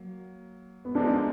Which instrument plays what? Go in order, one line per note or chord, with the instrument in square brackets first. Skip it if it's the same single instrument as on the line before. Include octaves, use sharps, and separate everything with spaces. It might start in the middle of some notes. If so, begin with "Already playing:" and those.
Already playing: [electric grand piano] F#3 A#3
[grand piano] B3
[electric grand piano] D2 D3 F3 G#3 D#4 [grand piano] D4